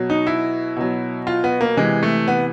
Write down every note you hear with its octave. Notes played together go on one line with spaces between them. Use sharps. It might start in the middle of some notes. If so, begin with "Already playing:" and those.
Already playing: B2 F#3
D#4
E4
B2 F#3
F4
B3
A#3
C3 E3 G#3
A3
B3